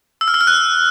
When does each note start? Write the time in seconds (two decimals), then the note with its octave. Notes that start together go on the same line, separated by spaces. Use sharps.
0.21 E6
0.28 F6
0.34 E6
0.41 F6
0.47 F#6